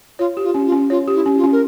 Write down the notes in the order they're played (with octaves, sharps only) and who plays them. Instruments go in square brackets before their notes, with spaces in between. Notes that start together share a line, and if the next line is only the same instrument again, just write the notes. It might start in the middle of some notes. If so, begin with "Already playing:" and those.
[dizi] F4 [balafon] C#5
[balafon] G4
[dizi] F4
[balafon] C#4
[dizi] F4
[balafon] C#4
[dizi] F4 [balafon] C#5
[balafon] G4
[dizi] E4
[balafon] C#4
[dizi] F4
[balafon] C#4
[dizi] A#4